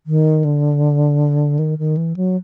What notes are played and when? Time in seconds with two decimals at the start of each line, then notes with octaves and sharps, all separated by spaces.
0.06 D#3
0.44 D3
1.59 D#3
1.78 D#3
1.97 E3
2.16 F#3